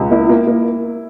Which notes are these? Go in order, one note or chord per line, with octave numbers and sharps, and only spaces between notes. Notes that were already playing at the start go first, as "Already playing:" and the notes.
Already playing: C#2
A#3 E4
A#3
A#3